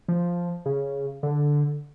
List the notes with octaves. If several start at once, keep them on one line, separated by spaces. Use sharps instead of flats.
F3
C#3
D3